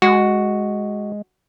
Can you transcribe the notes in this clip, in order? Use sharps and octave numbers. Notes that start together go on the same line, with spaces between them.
G#3 F#4